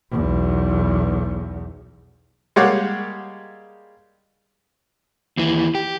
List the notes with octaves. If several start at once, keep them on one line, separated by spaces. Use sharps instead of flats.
B1 E2
G3 G#3 A#3 G4 C#5 F#5
D#2 E3
G4